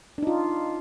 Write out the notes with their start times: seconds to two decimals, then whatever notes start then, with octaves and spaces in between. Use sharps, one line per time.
0.18 D4
0.23 D#4
0.27 F4